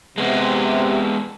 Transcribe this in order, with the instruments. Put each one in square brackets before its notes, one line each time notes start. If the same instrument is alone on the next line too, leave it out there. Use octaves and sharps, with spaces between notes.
[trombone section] C3 [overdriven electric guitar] G#3 B3